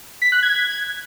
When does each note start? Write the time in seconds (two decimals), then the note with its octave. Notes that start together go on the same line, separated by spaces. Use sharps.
0.22 B6
0.32 F#6
0.43 G#6